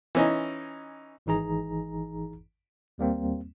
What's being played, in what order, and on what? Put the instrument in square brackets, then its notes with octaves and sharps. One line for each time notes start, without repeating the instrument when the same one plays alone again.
[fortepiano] E3 C#4 D#4
[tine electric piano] G#1 E3 D#4 G#4 A#5
D#2 G3 A#3 C4